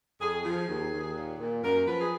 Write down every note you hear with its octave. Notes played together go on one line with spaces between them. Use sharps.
F2 G#4
F3 G#4
D#2
D#2
A#2
A#2
F#2 A#4
F3 B4
G#4